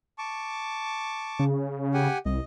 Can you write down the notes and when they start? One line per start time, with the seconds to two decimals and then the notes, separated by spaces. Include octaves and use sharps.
0.18 A5 C#6 D6
1.39 C#3
1.94 G4 F#5 G#5
2.26 C2 D#5